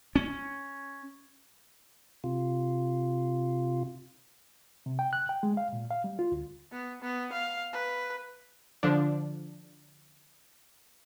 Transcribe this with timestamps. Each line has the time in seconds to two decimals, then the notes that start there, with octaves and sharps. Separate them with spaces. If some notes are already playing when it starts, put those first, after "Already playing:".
0.16 C#4
2.24 C3 F4
4.86 C3
4.99 G5
5.13 F#6
5.29 G5
5.43 G#3
5.57 F5
5.73 A#2
5.90 F5
6.04 G3
6.19 F4
6.32 D2
6.72 B3
7.02 B3
7.33 F5
7.73 B4
8.83 D3 F3 D4